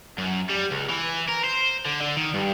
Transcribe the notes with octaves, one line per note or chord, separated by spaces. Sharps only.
F#2
G3
C#2
E3
A#4
C5
D3
D3
D#3
G2